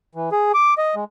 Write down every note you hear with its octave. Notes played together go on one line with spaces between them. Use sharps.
E3
G#4
D6
D#5
G#3